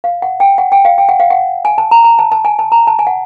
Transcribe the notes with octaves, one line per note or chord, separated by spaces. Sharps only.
F5
F#5
G5
F#5
G5
F5
G5
F#5
F5
F#5
G#5
A5
A#5
A#5
A5
A5
G#5
A5
A#5
A5
G#5
F#5